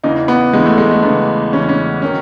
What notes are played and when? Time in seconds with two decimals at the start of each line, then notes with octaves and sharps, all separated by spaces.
0.04 E2 C#3 E3 D#4
0.28 B3
0.53 E2 C#3 E3 G#3
0.66 A3
0.78 G#3
0.91 A3
1.02 E2 C#3 E3 B3
1.53 E2 C#3 E3 C#4
1.69 C#4
2.02 D#3 F#3 C#4